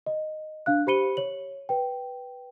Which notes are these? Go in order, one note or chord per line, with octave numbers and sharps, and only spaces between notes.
D#5
D4 F5 F#6
G4 C5 B5 C#7 D#7 G7
C#5 F#7
B4 G5